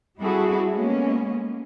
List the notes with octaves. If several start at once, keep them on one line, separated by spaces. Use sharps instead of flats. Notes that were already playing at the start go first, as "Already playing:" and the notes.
G3 C4 E4 F#4 G#4 A4
G#3 A#3 B3 C#4